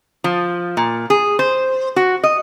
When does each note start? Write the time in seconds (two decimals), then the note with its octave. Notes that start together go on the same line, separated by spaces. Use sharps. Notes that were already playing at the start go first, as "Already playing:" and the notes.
0.24 F3
0.77 A#2
1.10 G#4
1.39 C5
1.96 F#4
2.24 D#5